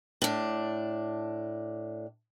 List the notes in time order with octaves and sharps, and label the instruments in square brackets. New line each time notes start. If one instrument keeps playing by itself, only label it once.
[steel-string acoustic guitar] A2 D4